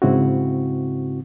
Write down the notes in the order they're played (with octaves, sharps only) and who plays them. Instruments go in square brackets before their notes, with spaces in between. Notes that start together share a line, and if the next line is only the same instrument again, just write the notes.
[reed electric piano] G#2 C#3 C4 E4 F#4